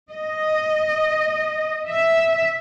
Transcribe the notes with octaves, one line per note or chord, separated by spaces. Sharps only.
D#5
E5